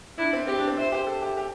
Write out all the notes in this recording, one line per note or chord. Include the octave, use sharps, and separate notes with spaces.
D4 E4
C4
C4 G4
D4
C4
E4 C5
G4
A4
G4
G4